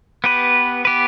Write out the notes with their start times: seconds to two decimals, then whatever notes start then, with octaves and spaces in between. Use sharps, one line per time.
0.24 B3 G4 B4
0.85 B3 G4 B4